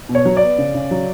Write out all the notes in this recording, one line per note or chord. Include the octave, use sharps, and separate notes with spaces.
B2
C#5
F#3
D5
B3
C#3
C#3
F#3